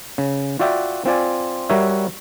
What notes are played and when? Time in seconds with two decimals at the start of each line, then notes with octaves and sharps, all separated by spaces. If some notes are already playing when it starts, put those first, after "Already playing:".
0.18 C#3
0.59 F4 F#4 D5 E5 G5
1.06 C4 F4 D5 G#5
1.69 G3 F#4 A#4 C#5 E5